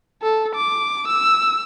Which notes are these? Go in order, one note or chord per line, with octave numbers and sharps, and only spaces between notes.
A4
D6
E6